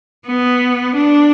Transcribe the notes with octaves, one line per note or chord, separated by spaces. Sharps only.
B3
D4